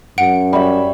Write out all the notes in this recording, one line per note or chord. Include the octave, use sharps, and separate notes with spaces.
F#2 F#5 D7
G3 C#5 E5